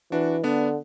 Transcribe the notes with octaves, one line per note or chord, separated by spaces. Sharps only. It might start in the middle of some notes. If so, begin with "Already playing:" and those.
E3 D4 F#4
D3 B3 D4